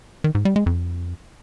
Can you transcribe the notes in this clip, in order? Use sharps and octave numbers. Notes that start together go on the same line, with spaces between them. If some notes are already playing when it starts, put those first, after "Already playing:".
D#3
G#2
G3
G#3
F2